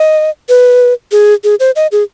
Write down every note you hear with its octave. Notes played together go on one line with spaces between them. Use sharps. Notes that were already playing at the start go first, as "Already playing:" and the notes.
Already playing: D#5
B4
G#4
G#4
C5
D#5
G#4